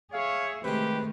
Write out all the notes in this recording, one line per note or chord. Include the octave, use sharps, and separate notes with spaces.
G#4 C#5 E5 F5
C3 D#3 G#3 A3 G4 B4